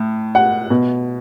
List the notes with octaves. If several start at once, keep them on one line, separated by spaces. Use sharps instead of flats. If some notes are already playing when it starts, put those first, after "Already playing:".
Already playing: A2
F#5
B2